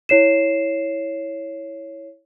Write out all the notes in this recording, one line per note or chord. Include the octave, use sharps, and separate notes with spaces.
E4 C#5 C7 E7